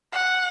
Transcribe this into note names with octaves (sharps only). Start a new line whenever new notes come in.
F#5